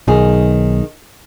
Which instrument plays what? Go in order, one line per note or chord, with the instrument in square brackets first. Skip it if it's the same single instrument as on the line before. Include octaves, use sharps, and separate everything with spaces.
[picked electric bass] B1 [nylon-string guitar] D#3 G#4